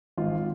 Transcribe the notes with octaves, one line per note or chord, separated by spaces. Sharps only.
G#1 F4